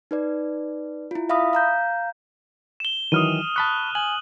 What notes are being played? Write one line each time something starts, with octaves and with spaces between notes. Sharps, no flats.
D#4 B4 D5
E4 F4
E5 F5 B5 D#6
F5 A#5 G6
E7 G7
D#3 E3 F#3 D#6 F6 D#7
A5 B5 C#6 F#6
G#5 F#7